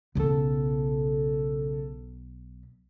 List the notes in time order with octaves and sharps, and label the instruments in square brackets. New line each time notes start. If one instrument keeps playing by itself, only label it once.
[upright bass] B1 B3 [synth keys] C#3 A4